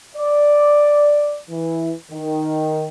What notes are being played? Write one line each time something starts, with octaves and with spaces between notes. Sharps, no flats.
D5
E3
D#3